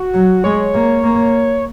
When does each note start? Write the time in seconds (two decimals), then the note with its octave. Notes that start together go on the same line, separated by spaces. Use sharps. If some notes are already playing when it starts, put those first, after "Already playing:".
Already playing: F#4
0.14 F#3
0.44 G#3 C#5
0.74 A#3
1.03 A#3